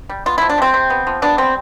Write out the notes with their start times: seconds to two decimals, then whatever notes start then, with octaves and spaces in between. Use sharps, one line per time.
0.09 G3
0.26 B3 F4
0.38 F3 E4
0.50 D4
0.58 C3 C4
0.74 C3
0.90 B3
1.07 F3
1.22 B3 D4
1.38 G3 C4